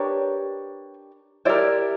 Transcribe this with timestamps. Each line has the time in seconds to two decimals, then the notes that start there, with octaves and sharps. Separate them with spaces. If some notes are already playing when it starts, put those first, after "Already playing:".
Already playing: D4 G4 A#4 B4 C#5
1.45 E4 G4 A#4 C5 D5